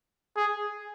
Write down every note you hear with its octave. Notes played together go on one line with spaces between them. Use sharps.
G#4